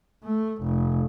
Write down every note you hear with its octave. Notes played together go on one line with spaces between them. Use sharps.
A3
F1